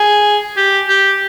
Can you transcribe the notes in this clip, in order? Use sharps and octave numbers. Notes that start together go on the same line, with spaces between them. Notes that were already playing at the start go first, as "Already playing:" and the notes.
Already playing: G#4
G4
G4